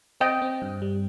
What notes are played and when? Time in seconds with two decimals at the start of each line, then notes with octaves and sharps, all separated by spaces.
0.20 C4 D#5 G5
0.42 C4
0.62 G2
0.82 G3